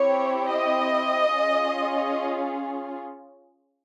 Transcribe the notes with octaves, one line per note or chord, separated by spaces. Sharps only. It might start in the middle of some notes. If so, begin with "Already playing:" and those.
Already playing: C4 E4 G4 C#5
D#5
C#4 F4 G#4